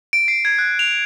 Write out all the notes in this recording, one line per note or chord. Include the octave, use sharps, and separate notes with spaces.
D7
C7
G#6
F#6
F7